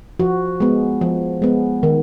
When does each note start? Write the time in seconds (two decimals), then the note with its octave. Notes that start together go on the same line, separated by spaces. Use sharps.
0.19 F3 F#4
0.60 G#3 B3
1.01 F3
1.42 G#3 B3
1.83 D#3